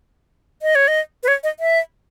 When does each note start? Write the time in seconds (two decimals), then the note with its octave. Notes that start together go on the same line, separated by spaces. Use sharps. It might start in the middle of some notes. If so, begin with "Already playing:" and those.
0.62 D#5
0.75 C#5
0.88 D#5
1.23 B4
1.28 C#5
1.43 D#5
1.60 E5